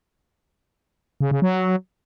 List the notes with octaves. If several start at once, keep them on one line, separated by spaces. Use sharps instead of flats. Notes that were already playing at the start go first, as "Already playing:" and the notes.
C#3
C#3
F#3